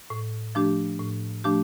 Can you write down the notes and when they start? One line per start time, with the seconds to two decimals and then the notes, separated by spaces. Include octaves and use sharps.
0.10 A2
0.55 F3 A3 D4 G4
1.00 A2
1.44 F3 A3 D4 G4